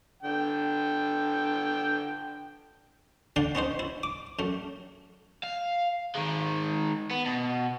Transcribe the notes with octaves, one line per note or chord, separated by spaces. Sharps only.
D3 G5
D3 D4 F5 G5
B3 C#4 D#4 C5
E4
D6
F#2 A3
F5
D#3 G#3
B3
B2